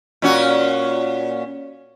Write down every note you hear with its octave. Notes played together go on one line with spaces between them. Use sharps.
A#2 C#4 F#4